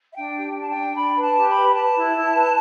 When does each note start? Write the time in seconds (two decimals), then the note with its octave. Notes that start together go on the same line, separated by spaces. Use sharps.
0.12 E5
0.17 D4 G5
0.36 G4
0.57 D4
0.62 A5
0.69 G5
0.76 D4
0.96 D4 B5
1.16 B4
1.22 A5
1.35 G4
1.48 B5
1.56 B4
1.75 B4 A5
1.95 E4
2.15 E4
2.34 B4